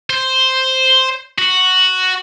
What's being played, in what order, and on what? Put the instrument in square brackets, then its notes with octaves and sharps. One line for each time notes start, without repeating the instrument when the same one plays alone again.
[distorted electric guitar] C5
F#4